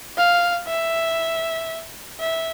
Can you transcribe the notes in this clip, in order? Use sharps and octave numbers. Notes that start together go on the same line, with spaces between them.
F5
E5
E5